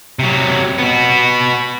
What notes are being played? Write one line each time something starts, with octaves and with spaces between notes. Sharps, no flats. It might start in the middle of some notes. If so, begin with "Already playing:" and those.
C3 F#3
B3 F#4